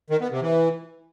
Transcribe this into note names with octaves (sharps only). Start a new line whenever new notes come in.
D#3
B3
C3
E3